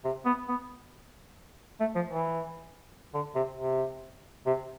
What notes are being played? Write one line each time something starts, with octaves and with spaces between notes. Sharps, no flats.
C3
B3
B3
A3
F3
E3
D3
C3
C3
C3